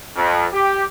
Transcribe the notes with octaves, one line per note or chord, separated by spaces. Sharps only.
F2
G4